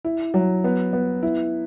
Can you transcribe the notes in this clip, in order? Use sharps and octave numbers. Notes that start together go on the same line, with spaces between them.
E4
F#3
B3
B3
E4